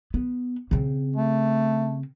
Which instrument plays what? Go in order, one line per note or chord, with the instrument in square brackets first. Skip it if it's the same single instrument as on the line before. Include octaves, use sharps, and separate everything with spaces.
[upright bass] B3
C#3 C4
[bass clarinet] A3